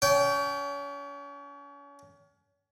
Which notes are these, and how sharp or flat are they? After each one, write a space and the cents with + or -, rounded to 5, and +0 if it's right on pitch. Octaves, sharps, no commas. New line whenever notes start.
C#4 +35 G5 -15